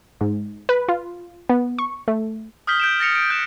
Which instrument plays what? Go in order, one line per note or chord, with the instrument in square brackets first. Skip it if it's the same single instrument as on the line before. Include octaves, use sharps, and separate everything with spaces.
[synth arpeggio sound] G#2
B4
F4
B3
C#6
A3
[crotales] D#6 F6 G6 B6 G7
G6 D7 E7
A6 A#6 C#7 F7
D7
F#6 G6 E7